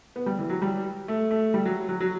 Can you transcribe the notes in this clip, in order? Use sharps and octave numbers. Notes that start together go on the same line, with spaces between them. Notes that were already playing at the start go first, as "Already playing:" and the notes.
B3
G3
E3
F#3
G3
A3
A3
G3
F#3
F#3
F#3